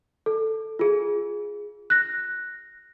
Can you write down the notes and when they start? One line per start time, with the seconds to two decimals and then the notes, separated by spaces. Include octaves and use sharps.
0.26 A4
0.79 F4 G#4
1.90 F#6 A#6